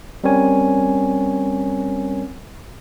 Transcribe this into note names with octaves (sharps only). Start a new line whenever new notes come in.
G3 C4 C#4 A#4 C#5 G#5